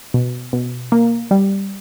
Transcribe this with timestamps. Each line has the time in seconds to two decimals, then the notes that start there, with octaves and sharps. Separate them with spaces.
0.14 B2
0.53 B2
0.92 A#3
1.31 G3